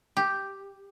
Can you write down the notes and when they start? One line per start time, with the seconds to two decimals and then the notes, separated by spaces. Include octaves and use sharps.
0.17 G4